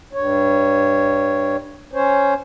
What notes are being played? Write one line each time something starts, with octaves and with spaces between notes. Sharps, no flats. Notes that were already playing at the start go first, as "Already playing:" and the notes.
G2 C#5
C#4 C5 C#5